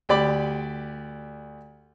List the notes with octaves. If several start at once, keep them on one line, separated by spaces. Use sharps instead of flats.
D2 G4 D5 B5 D6